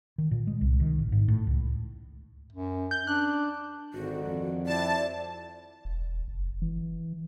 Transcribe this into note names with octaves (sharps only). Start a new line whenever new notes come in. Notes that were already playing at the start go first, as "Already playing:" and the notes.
D#3
A#2
G#3
C2
D#3
A1
G#2
A2
C#2
F#2
G6
D4 F#6
G#1 D3 D#3 F#4
F2
C4 E4 D5 A5
E1
F#1
E3